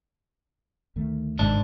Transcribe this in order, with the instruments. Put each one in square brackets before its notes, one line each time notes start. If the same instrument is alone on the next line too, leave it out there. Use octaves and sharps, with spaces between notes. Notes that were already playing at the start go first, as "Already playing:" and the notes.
[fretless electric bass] D2 D#3 A3
[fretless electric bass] G1 C3 D#3 [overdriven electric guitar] G#2 [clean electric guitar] D4